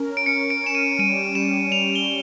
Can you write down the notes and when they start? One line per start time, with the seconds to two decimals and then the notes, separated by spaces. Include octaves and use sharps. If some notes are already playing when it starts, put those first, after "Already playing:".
Already playing: C#4 A#4
0.17 D7
0.26 C#4 C#7
0.50 D7
0.63 C#4 E7
0.75 D#7
0.99 G3 D#7
1.35 G3 E7
1.71 G3 F7
1.95 G7